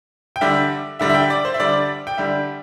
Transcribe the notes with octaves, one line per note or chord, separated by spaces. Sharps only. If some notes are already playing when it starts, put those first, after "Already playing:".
G5
D3 G3 E5
D3 G3 E5
E5
G5
D5
C5
E5
D3 G3 D5
G5
D3 G3 E5